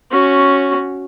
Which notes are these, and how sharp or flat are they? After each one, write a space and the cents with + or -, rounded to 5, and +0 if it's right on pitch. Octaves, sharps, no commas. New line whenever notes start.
C#4 +0 F#4 +0